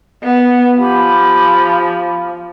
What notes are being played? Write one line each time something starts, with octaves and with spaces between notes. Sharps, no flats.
B3
F3 G4 G#5 B5